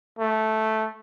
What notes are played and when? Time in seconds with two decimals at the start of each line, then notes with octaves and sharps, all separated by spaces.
0.19 A3